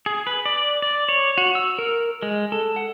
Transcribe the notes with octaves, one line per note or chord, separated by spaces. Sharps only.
G#4
B4
D5
D5
C#5
F#4
E6
A#4
G#3
A4
F#5